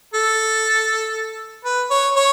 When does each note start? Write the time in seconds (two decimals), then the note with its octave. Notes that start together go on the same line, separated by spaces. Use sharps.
0.14 A4
1.65 B4
1.91 C#5
2.16 C#5